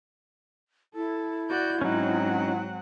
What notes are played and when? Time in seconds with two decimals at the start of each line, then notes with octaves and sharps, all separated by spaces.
0.95 E4 A4
1.50 F#4 D5 G6
1.81 G#2 F#3 C4 C#4 D#4 F#5